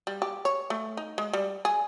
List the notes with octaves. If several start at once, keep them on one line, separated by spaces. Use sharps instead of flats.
G3
G4
C#5
A3
D#4
G#3
G3
G#4